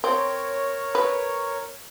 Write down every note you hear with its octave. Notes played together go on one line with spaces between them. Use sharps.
C4 A#4 C#5
B4